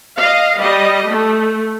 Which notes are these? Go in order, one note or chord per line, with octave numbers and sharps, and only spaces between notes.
D#5 F5
G3 D#5
A3